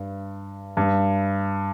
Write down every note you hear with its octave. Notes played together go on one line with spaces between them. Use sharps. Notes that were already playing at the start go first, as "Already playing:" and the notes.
Already playing: G2
G2